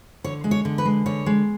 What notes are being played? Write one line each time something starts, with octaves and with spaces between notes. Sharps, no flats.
D3 C#5
G#3
C#5
D3
B4
G#3
D3 C#5
G#3